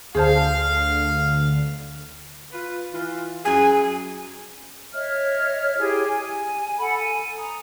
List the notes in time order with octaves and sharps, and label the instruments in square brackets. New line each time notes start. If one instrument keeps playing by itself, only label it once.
[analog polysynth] D2 D3 [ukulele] G#4 C5 A5 [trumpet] F5
[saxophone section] F4 B4
E3 F4
[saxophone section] F#2 G#4 [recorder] G#5
[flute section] C#5 D#5 E5 F6
E4 G4 G#4
G#5
A4 F#5 B5
G#5
A#5 D#6